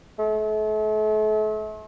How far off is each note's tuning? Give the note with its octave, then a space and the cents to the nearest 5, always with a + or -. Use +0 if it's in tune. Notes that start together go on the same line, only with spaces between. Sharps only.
A3 -40